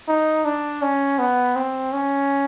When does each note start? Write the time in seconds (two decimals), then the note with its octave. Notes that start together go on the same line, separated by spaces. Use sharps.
0.09 D#4
0.45 D4
0.82 C#4
1.19 B3
1.56 C4
1.93 C#4